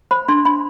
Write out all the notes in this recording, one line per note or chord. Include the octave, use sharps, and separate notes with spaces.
C5 B5
D4 C6
D4 B5